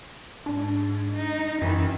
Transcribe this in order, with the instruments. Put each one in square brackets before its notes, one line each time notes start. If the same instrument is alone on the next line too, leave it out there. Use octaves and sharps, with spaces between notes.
[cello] G#2 [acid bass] D4
[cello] D#4
[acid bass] F#2 [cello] D#3 E3